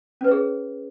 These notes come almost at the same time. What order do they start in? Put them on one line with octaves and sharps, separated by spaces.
C#4 B4 C#5 G#4